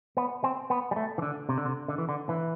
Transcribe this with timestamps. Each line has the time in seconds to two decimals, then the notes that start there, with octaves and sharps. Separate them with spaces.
0.17 B3
0.44 C4
0.70 B3
0.91 G3
0.96 A3
1.18 E3
1.22 D3
1.49 C3
1.58 D3
1.65 C3
1.88 D3
1.98 E3
2.09 D3
2.29 E3